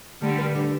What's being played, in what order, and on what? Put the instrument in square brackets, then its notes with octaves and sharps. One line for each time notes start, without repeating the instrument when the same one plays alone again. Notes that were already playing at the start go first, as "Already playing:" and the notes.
[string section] D3 G3 [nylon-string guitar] A3
[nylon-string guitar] B4
D3